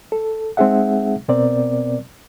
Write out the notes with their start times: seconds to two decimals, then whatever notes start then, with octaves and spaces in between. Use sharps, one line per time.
0.12 A4
0.57 G#3 C4 D#4 G#4 E5 F#5
1.28 B2 B3 C4 A#4 D5